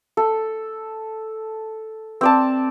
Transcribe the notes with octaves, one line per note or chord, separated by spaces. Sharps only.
A4
C4 D5 A5